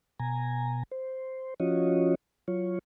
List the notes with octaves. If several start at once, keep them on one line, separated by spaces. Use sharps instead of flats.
B2 G#5 A#5
C5
F3 C#4 F4 F#4 C#5 D#5
F#3 F4 C#5